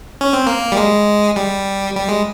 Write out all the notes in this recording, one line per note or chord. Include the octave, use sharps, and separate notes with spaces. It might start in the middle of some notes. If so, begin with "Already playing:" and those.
C#4
C4
A#3
G3
G#3
G3
G3
G#3